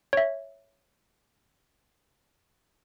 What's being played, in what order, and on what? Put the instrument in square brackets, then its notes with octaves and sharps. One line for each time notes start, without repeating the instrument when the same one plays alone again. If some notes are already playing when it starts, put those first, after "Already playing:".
[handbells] C#5 E5